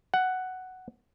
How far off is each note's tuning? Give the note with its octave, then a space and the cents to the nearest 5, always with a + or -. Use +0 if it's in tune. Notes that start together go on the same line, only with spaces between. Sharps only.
F#5 +5